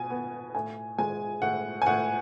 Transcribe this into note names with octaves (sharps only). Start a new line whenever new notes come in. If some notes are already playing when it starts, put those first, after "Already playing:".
Already playing: B2 G#5
B3
A2 G#5
G#3 G#5
A2 F#5
G#5
A2 F#5